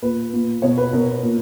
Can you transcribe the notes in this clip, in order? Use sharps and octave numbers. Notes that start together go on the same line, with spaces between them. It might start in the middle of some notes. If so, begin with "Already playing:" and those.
A#2 B4
A#2
B2 C#5
B4
B2 A#4
A#2